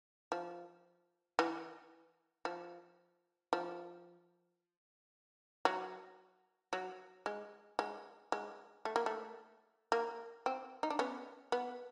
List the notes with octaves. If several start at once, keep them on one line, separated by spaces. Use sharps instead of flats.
F3
E3
F3
F3
F#3
F#3
G#3
G#3
G#3
A3
A#3
A3
A#3
C4
D#4
D4
B3 C#4
B3